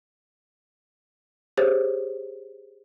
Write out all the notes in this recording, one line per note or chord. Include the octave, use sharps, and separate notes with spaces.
G4 G#4 C5 C#5 A6